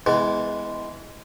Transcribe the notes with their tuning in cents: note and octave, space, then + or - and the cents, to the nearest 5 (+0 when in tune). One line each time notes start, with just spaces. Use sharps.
E3 -15 G#3 +0 B3 +20